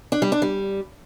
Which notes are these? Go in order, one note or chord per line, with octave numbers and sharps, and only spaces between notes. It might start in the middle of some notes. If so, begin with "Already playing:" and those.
D4
G3
D4
G3